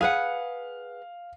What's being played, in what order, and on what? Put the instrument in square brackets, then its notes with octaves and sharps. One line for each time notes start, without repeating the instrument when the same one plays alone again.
[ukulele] G#4 B4 F#5 [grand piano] F5